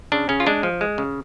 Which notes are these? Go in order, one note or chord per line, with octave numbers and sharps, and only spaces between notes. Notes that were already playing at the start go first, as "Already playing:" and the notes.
C#3 D4
C#3 C#4
F4
G#3 D4
F3
G#3
C#3